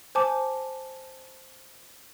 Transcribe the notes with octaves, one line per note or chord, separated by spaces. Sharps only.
C5 G#5 A5 D6